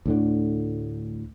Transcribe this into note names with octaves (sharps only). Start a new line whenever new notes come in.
D2 A2 D3